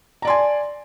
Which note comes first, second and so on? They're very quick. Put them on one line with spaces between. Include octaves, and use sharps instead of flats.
A#5 D5 C6 G#5